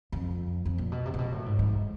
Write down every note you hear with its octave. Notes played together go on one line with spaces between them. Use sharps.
F2
F2
A#2
B2
C3
A#2
B2
A2
G#2
G#2